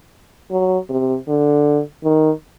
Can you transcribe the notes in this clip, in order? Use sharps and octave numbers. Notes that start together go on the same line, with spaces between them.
F#3
C3
D3
D#3